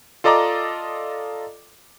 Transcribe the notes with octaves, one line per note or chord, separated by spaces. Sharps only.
F4 A4 D5 D#5 A#5 D6